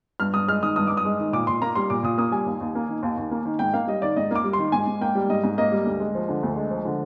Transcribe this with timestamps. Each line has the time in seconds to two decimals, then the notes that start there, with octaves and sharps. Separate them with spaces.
0.20 G2 F6
0.34 G2 D#6
0.48 G#3 F6
0.62 D#3 D#6
0.76 G2 D#6
0.87 G2 D6
0.97 D#6
1.05 G#3
1.19 D#3
1.33 A#2 D6
1.47 A#2 C6
1.62 A#3 A#5
1.75 G3 C6
1.90 A#2 D6
2.03 A#2 D#6
2.18 A#3 D#6
2.32 G3 G#5
2.46 D#2
2.61 D#2
2.75 A#3
2.89 D#3
3.03 D#2
3.17 D#2
3.31 A#3
3.45 D#3
3.59 G#2 G5
3.74 A#3 F5
3.87 G3 D#5
4.02 D#3 D5
4.17 G#2 D#5
4.31 A#3 D6
4.44 G3
4.53 D#3 C6
4.72 G#2 G#5
4.87 G#2
5.01 A#3 G5
5.15 G3
5.29 G#2 D#5
5.44 G#2
5.58 A#3 D#5
5.72 G3
5.85 D2
6.00 G#3
6.15 F3
6.28 D3
6.43 D2
6.56 G#3
6.70 F3
6.85 D3